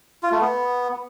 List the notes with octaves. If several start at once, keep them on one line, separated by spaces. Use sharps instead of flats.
F4
A3
B3